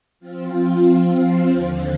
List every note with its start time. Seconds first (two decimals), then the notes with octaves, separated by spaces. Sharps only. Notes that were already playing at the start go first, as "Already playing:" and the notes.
0.20 F3 C4 F4
1.48 D#2 D3 F3